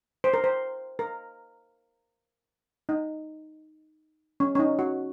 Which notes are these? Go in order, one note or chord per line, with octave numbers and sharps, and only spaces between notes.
C5
A#4
C5
A#4
D#4
C#4
C#4
D#4
F#4